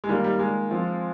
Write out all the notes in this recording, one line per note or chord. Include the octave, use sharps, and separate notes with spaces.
G#3
D#3 G3 A#3 F4
G3
G#3
F3 C4 F4